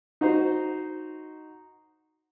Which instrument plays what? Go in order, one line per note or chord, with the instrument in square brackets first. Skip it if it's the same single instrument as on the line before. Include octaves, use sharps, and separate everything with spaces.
[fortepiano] D#4 F#4 C5